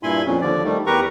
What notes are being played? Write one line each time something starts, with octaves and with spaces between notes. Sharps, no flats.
G2 A#2 E4 G#5 B5 C6
F2 A#2 C#4
D#2 D3 F3 D5
D#3 G3 A3
E2 G4 A#4 B4 A#5 C#6